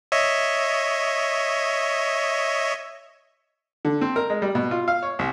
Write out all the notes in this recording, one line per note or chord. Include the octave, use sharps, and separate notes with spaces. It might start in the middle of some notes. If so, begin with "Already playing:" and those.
C#5 D#5 E5
D3
C4
A#4
G#3
G3
B2
F4
F5
C#5
C2